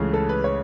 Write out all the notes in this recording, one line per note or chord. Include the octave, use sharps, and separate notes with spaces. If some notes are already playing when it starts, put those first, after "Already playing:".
Already playing: C#2 C#3 E3 A3
A4
B4
C#5